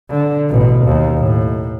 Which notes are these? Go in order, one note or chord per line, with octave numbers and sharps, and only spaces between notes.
D3
A1 B2
D#2
A2